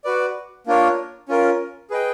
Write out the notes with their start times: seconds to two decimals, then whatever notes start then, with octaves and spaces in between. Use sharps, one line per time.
0.04 F#4 B4 D5
0.67 A#3 D4 F4 A#4 C#5
1.29 C#4 F4 A#4
1.90 G#4 B4 D#5 G5